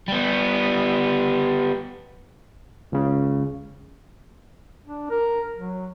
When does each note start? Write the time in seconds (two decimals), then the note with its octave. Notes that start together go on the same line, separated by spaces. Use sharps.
0.08 G3 B3
2.92 C#2 C#3
4.84 D4
5.10 A#4
5.58 F#3